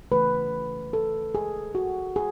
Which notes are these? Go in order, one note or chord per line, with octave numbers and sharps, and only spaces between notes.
C#3 E3 A3 B4
A4
G#4
F#4
G#4